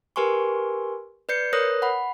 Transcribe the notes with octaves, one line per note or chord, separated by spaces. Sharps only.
G4 A#4 B4 G#5 C6 C#6
B4 D5 G6 C7 C#7
A#4 B4 C#5 D#6 F#6 A#6
F#5 B5